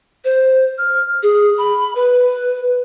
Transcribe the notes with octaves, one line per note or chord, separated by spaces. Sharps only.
C5
F6
G#4
B5
B4